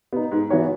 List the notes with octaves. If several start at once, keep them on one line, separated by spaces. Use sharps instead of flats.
B3 D#4
G#2
E3 B3 F#4 C#5